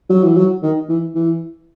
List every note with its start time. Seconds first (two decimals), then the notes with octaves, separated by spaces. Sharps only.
0.10 F#3
0.23 E3
0.36 F#3
0.63 D#3
0.89 E3
1.15 E3